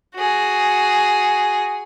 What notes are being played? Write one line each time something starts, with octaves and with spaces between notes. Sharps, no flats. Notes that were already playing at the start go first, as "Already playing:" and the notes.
F#4 G#4